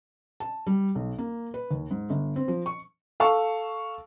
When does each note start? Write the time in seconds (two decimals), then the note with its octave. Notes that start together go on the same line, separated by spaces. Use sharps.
0.40 A5
0.67 G3
0.95 B1
1.18 A#3
1.54 B4
1.71 D#2
1.91 G#2
2.10 G1
2.36 C4
2.48 F3
2.66 C#6
3.20 A4 F5 A5 C#6